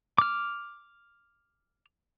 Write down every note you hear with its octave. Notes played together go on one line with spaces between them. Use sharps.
D6 F6